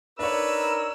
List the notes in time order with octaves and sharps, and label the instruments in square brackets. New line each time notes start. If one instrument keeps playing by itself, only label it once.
[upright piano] D4 C#5 [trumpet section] D#4 A#4 [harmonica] B4 [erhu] E6